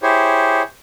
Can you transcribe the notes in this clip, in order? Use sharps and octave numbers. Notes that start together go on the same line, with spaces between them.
E4 G4 G#4 C5 C#5